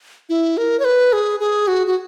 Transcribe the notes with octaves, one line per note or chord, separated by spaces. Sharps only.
E4
A#4
C#5
B4
G#4
G#4
F#4
F#4